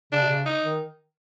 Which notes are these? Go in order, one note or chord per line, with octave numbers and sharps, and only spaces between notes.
C#3 D4
C3
C#3
D#4
D#3